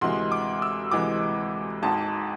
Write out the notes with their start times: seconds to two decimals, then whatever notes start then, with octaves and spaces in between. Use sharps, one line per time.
0.01 D2 C3 E3 G#3 C6
0.32 D6
0.62 E6
0.91 D2 C3 E3 G#3 D6
1.82 G#1 G#2 G#3 A5